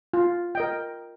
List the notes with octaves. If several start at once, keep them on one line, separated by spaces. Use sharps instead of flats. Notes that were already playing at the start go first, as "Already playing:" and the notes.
F4
A#4 D#5 G5